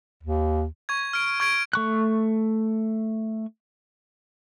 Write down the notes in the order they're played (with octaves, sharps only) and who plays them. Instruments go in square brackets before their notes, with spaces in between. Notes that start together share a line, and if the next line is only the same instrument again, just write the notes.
[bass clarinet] D#2
[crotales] C#6 G#6
F6 D7
C#6 G#6 D7
[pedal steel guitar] A3 C#6 F#6